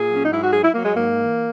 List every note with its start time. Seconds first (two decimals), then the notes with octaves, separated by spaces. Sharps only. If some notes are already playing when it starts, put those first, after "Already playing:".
Already playing: A#2 G#4
0.09 F#3
0.14 C#4
0.24 D#4
0.31 G#2 E4
0.43 F#4
0.53 F#3 G#4
0.63 E4
0.74 F#3 A#3
0.85 G#3
0.95 G#2 A#3
1.17 E3